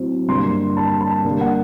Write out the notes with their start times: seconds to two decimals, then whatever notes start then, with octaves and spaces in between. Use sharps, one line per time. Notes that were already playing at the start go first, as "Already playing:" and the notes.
Already playing: A2 F#3 C4
0.28 G2 D3 G3 A#3 C6
0.77 A5
1.01 A5
1.25 D3 G3 A#3
1.41 F#5